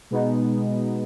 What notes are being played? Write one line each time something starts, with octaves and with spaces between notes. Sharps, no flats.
B2 G#3 B3 D#4